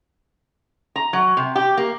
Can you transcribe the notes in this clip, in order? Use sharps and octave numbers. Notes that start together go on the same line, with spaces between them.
A#5
F#3
C3
G4
A#3